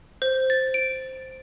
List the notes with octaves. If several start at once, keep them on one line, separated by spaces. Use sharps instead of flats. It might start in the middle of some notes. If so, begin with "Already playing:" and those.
C5
A6
D7